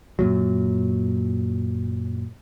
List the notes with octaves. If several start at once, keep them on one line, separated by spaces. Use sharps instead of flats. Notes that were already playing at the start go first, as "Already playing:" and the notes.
F#2 A#2 F#3